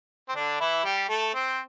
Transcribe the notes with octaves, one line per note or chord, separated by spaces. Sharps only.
C4
D3 D4
E3 E4
G3 G4
A3 A4
C4 C5